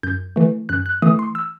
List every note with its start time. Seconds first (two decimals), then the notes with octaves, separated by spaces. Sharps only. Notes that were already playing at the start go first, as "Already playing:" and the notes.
0.03 F#2 G6
0.36 E3 A3
0.69 F#2 F#6
0.86 F#6
1.02 E3 A3 D#6
1.19 C6
1.35 E6